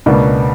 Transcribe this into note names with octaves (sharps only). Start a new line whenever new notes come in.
C#2 B2 A#3 D4